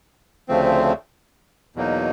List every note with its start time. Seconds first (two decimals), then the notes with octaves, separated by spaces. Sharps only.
0.48 D2 C#3 F3 A3 C4
1.76 E2 B2 F#3 A#3 D#4